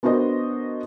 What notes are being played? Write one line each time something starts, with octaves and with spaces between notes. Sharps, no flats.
B3 D4 F#4 A#4 C5 D#5